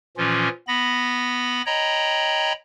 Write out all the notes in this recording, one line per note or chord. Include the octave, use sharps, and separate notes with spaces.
A#2 E3 F3 C#4 F4
B3 B5 A#6
C#5 D#5 G5 A#5 B5